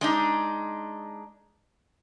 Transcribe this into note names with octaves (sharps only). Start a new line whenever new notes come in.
G#3 D4 D#4